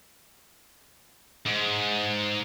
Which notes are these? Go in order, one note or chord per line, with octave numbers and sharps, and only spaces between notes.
G#2